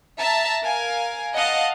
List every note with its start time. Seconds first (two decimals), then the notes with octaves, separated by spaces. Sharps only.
0.18 E5 A5 A#5
0.63 A#4 F5 G#5
1.35 D#5 F5 F#5 A5